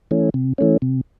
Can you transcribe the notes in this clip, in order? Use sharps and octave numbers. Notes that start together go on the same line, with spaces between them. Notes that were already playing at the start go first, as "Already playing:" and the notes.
E3 A3 C#4
C3
E3 A3 C#4
C3